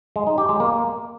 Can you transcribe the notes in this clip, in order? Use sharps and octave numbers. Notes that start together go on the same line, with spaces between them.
G#3
D#4
G4
G#3
A#3